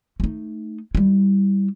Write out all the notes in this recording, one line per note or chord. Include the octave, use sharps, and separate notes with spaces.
A3 D#4
G3 E4